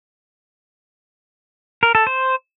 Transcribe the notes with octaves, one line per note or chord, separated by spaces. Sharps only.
A#4
A4
C5